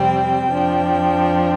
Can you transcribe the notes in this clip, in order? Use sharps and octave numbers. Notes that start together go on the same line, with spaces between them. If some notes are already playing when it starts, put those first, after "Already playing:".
Already playing: F2 C3 G3 C4 G5
F2 F3 D4